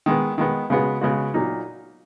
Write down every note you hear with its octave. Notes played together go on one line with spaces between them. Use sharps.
D#3 G#3 B3
D#3 G#3 B3
C#3 G#3 B3 F#4
C#3 G#3 B3 F#4
A#2 F#3 A#3 D#4